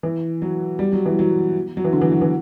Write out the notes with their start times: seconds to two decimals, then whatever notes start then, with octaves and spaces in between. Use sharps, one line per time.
0.03 E3
0.42 F#3
0.79 G3
0.93 F#3
1.06 E3
1.19 F#3
1.77 F#3
1.85 E3
1.93 D3
2.01 E3
2.12 F#3
2.21 E3